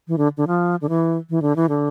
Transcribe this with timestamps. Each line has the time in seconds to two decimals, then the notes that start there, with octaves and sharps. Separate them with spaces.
0.08 E3
0.18 D3
0.37 D3
0.47 F3
0.81 D3
0.89 E3
1.30 E3
1.42 D3
1.56 E3
1.69 D3